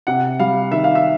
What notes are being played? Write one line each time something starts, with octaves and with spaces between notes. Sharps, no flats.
C3 F#5
G3 F5
D#3 E5
F5
E5